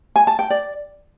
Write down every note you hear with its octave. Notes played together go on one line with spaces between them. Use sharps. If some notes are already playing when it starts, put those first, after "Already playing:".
G#5
A5
G5
D5